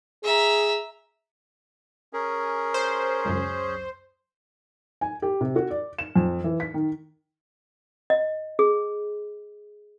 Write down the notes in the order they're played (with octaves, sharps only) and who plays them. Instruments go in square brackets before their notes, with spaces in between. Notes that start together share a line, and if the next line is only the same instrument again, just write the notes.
[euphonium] G#4 [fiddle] E5 A#5
[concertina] C#4 G#4 [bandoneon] A#4
[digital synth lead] C5
[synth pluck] C#2 F#2
[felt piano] G#5
G4
C3
F#4
D5
E7
F2
E3
B6
D#3
[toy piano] D#5
G#4